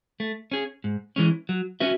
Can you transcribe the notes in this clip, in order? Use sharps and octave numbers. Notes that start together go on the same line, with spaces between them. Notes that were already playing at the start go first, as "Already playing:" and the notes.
A3
C#4 G#4
G#2
E3 G#3 C#4
F#3
C#4 F#4 B4 E5